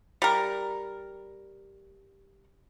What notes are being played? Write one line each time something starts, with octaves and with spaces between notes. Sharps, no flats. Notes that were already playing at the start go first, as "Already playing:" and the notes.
G3 A#4